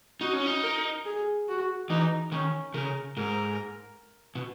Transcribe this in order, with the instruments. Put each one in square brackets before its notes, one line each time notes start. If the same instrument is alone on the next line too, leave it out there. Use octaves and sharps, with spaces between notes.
[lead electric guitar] D#4 [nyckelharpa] F#4
[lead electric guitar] C#4
D#4
[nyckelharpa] A#4
G#4
F#4
[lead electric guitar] E3 [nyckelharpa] D#4
[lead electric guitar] D#3 [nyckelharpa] C#4
[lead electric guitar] C#3 [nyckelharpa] A#4
[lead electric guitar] G#2 [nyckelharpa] A#4
[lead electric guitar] B2